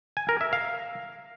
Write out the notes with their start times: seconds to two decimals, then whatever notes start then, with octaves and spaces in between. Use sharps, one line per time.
0.17 G#5
0.29 A#4
0.41 E5
0.53 F5